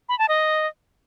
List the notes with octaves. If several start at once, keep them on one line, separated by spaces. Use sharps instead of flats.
B5
A5
D#5